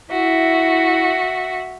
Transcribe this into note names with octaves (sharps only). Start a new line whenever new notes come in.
E4 F#4 E5